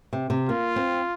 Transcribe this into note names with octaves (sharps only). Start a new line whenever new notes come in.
C3
C3
A#3 F4
C4